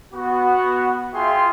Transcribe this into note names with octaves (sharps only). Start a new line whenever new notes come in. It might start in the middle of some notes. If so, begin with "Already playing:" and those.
B3 F#4
F4 G#4 E5 G5 C6